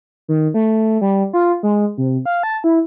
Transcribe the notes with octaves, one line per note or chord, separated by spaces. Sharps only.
D#3
A3
G3
F4
G#3
C3
F5
A5
E4